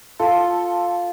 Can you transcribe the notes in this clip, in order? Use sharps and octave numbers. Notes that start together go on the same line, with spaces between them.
F4 A4